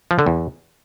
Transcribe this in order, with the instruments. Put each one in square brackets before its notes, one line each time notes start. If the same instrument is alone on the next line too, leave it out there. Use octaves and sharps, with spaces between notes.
[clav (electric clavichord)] F3
D3
E2